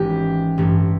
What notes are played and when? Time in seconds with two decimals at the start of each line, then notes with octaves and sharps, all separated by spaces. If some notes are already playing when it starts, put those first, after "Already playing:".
Already playing: G#1 G#2 E3 G#3 C#4 G4
0.58 A1 G2 E3 A3